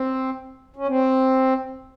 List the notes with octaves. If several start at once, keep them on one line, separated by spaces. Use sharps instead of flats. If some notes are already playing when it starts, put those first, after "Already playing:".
Already playing: C4
C#4
C4